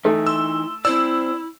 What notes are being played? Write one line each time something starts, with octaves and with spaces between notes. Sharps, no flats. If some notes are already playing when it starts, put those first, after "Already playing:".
E3 A3 D#4 E4
C6 E6
C4 E4 C5 D5 E6